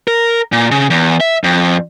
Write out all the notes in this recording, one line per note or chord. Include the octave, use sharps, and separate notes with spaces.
A#4
A#2
C#3
E2
E5
F2